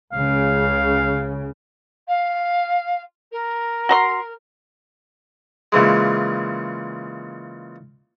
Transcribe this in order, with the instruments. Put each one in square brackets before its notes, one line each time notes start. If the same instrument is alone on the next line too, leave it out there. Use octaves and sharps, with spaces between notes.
[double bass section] C#2 C#3 [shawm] F5
[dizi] F5
A#4
[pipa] F#4 A#5 C6
[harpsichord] A#2 C#3 E3 G#3